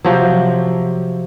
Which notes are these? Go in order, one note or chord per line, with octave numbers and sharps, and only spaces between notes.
C3 F3 F#3